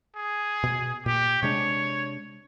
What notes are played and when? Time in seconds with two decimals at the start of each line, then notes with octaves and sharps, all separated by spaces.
0.16 G#4
0.63 B2
1.06 A#2 G4
1.43 C3 G#3 D4 C#5